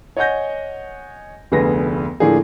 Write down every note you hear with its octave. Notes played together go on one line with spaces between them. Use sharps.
C#5 D#5 F#5 G#5 G6 A#6
F1 D2 B3 G#4 B4 A#6
A2 D3 F3 A#3 D4 G#4